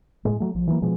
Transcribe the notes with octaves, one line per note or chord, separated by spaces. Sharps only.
A2 G#3
F#3 A3
A#1 F3
E3 F#3 G3 A#3
B2 F3 G#3